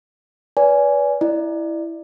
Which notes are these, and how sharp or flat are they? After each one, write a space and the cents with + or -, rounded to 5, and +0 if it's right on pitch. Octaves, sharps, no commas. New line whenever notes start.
B4 -10 D5 -35 G#5 +0
E4 +0 D5 +25